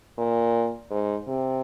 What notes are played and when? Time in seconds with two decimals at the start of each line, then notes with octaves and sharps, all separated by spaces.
0.18 A#2
0.90 G#2
1.27 C3